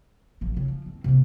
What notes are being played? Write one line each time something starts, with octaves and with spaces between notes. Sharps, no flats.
A1 F3
C#3
F3
E2 C4
C3 A#3